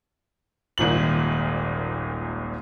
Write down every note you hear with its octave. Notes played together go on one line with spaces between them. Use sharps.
D#1 G#1 A#2 F#7